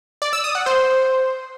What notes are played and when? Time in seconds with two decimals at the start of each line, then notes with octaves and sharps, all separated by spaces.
0.22 D5
0.33 E6
0.44 D#6
0.55 F#5
0.66 C5